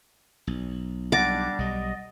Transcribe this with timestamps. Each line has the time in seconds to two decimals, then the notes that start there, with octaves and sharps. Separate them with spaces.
0.47 B1
1.12 G3 D4 F#5 D6 A6 A#6
1.59 B1 G3 D#5